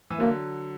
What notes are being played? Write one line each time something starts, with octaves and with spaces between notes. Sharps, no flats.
E3
D3 F#3 A#3